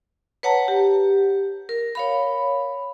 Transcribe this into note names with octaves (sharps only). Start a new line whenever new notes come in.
B4 C#5 F#5 A5 A#5
G4
A#4
C#5 F5 B5